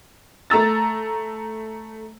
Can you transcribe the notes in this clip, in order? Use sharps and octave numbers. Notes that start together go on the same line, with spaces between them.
A3 A#5 E6 A6